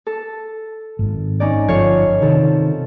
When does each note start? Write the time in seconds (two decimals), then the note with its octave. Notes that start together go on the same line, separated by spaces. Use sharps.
0.07 A4
0.99 G#1 G#2
1.40 C#4 D#4 D5
1.68 G1 F3 A4 C#5 F5
2.22 C3 D#3 F3 A4